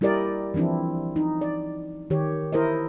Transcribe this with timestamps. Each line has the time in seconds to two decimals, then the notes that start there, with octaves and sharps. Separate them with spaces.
0.01 G3 E4 G4 A#4 D5 D#5
0.54 E3 F3 C4 D4 E4
1.16 D#4
1.41 D5
2.10 D#3 G4 C#5
2.53 E4 A#4 C5 D#5